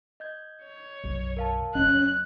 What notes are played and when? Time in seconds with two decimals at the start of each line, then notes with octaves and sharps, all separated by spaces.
0.20 D#5 G6 G#6
0.64 C#5
1.04 B1 F#2
1.37 A#4 F5 A5
1.75 F#1 G3 C#4 D#5 F#6